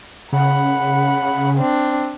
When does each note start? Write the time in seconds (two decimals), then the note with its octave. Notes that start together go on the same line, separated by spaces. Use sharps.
0.32 C#3 F#5 B5
1.58 C4 D4